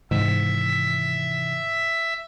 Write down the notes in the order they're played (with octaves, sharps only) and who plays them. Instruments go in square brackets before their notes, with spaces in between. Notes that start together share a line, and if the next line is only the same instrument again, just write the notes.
[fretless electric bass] G#2 [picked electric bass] C3 D#3 E3 [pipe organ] E5